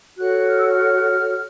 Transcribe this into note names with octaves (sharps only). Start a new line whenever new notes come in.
F#4 A4 C#5 F#6
F6
E6
F6